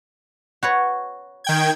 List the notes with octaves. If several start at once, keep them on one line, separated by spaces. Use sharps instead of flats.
F#4 B4 C#5
D#3 G5 G#6